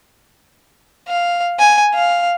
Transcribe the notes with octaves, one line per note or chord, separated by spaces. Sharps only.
F5
G#5
F5